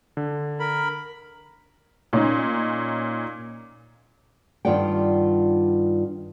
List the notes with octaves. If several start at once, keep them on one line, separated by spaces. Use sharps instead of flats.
D3
A#4 B5
A#2 C#4 D#4
G2 D#3 F4 D5 F#5 G5